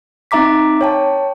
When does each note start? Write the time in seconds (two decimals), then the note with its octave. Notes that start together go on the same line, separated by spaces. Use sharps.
0.31 C4 D#4 E5 A#5 D6 B6
0.81 C#5 G5 A5